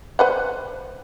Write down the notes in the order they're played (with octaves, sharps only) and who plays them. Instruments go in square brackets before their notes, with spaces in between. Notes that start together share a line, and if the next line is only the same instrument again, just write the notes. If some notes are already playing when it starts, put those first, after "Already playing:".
[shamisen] B4 C5 F#5